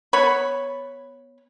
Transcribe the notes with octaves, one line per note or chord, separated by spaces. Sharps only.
B3 C#5 B5